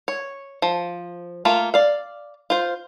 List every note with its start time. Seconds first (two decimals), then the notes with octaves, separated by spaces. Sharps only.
0.08 C#5
0.62 F3
1.45 A3 A#3 F4
1.74 D5 F5
2.50 F4 C5